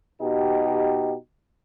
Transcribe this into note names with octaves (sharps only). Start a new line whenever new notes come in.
B2 D#4 G4